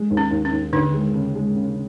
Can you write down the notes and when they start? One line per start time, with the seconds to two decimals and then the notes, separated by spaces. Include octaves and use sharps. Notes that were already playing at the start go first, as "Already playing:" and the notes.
Already playing: G#3
0.11 D#2
0.17 C#4
0.31 D#2
0.45 C#4
0.52 D#2
0.73 D#2 D3 D4
0.94 G#3
1.14 C#3
1.35 G#3
1.55 C#3